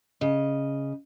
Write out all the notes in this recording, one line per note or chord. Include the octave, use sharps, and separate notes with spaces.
C#3 D#5